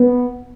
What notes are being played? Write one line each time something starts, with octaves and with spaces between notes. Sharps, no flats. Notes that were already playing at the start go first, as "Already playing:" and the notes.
Already playing: B3